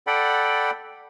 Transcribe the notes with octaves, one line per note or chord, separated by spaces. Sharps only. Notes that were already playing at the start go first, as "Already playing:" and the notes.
A4 D5 F#5 G5 B5